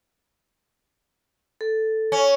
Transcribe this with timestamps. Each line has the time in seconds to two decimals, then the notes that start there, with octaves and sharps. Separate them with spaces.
1.61 A4
2.12 C#4